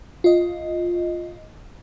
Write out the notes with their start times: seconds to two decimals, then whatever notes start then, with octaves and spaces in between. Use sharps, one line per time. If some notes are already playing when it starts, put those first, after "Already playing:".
0.24 F4 D#5